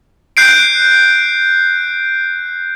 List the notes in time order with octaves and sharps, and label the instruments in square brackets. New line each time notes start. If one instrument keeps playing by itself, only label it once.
[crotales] F#6 G6 C7 D7